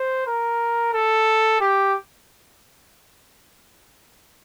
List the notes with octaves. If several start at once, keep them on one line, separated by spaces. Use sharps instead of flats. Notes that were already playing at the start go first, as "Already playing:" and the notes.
Already playing: C5
A#4
A4
G4